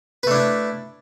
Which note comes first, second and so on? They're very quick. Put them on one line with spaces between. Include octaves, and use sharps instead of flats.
B4 A3 D4 E4